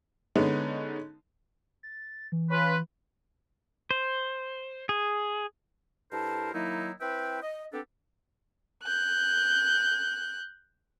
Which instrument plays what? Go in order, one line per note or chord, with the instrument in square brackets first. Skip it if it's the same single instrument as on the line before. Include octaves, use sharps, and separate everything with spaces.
[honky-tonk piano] D3 G#3 B3 C#4 D#4
[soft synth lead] A6
E3
[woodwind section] C#4 F4 B4
[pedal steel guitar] C5
G#4
[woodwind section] G2 E4 A4 A#4 C5 A5
D#3 F#3 A#3 D#4 E4
C4 E4 B4 E5 G5
D#5
B3 C4 D4 G4 A4
[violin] F#6 G6